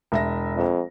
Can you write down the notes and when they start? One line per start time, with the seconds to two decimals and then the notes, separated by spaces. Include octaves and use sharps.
0.12 E1 E5 A#6
0.56 F2